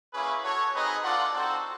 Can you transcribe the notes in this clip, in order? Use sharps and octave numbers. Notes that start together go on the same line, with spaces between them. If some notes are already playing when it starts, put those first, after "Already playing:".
A#3 C#4 E4 G#4 B4
F#4 A4 C#5
C4 D#4 G#4 B4 D#5
D4 F4 A4 D5 F#5
C4 D#4 F#4 A4 C5